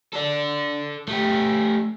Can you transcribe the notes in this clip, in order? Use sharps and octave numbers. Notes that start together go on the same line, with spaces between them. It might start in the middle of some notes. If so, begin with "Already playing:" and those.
A4 D5
A3 G4